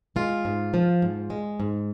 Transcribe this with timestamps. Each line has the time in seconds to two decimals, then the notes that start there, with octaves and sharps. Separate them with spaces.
0.16 G#3 F4
0.45 G#2
0.74 F3
1.02 G#2
1.30 G#3
1.60 G#2